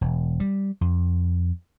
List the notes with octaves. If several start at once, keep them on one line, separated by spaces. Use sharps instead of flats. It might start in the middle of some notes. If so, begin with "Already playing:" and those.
E1
G3
F2